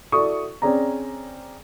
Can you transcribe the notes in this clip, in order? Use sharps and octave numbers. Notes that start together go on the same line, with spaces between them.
E4 F#4 A4 D5 C#6 D#6
C4 C#4 G#4 D5 A#5